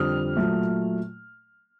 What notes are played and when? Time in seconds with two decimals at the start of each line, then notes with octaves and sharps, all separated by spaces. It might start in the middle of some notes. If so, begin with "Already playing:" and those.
Already playing: F2 D3 G3 D#6 F6
0.37 A#2 F#3 A3